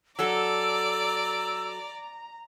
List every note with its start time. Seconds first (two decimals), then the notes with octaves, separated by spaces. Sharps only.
0.19 F#3 A4 D5 A#5 E6